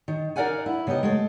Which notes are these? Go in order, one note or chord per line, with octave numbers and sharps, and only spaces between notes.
D#3
D#4 A#4 D5 F5 F#5 G#5
E4
C#3 B3 D#4 G4 D#5
G#3 A3 A4